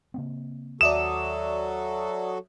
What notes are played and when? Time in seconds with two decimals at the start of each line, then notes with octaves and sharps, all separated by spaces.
0.14 C#3 A#3 C4
0.81 D#2 F#3 F#4 A4 D5 E5 D#6 E7